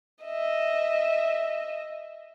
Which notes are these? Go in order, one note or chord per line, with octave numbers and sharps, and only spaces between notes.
D#5 E5